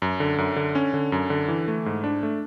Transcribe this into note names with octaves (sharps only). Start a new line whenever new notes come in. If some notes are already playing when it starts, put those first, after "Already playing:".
F#2
D3
F#2
D3
C#4
D3
F#2
D3
E3
A3
G#2
D4
A3